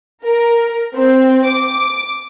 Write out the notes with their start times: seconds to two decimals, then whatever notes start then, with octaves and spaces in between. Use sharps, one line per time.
0.24 A#4
0.95 C4
1.47 D6